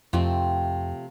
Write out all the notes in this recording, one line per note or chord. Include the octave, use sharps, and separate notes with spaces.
F2 C3 F3 A3 C4